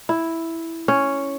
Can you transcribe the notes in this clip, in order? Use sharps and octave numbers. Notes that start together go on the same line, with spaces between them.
E4
C#4